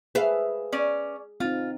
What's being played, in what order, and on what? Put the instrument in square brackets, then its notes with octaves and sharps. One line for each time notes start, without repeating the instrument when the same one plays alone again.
[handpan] G#4 [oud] B4 E5 F5
[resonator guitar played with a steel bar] C#4 D5
[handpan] C4 D#4 [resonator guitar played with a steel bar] F4